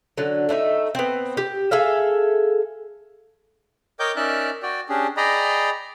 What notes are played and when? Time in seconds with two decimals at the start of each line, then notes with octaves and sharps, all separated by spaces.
0.18 D3 F#3
0.49 A3 D4 D#4 E5
0.95 B3 C4
1.37 G4
1.71 G#4 A4 E5 F5
4.00 A#4 C#5 D#5 G5 D6 G6
4.16 C#4 D#4 A#4 D5 E5 F#6
4.63 F#4 D5 G5
4.89 C#4 D4 G4 G#4
5.17 G#4 D5 D#5 G5 A#5 B5